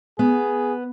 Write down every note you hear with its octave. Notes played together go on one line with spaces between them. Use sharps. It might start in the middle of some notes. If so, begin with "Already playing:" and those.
B3 G#4